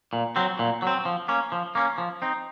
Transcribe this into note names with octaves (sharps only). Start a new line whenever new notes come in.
A#2
F#3 C4
A#2
F#3 C4
F3
A#3 C#4
F3
A#3 C#4
F3
C4 D#4